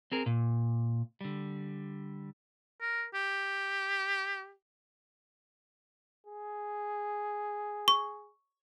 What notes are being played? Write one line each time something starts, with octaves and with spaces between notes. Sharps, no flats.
C4 G#4 A#4
A#2
D3 G3
A#4
G4
G#4
C#6